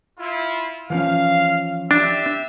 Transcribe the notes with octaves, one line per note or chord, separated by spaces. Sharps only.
E4 F4
E3 F3 C#4 F5
D4 G4 E5